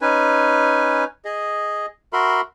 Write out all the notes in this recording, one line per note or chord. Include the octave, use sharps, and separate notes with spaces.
C#4 D#4 B4 G#5
G#4 D#5
F#4 A#4 E5 B5 C6